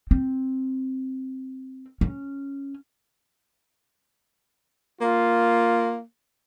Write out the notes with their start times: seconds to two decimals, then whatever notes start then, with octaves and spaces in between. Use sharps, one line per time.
0.11 C4
2.01 C#4
5.01 A#3 F4